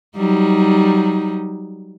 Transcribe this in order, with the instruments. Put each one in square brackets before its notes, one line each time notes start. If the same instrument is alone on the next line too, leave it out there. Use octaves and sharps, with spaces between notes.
[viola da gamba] F#3 G3 D#4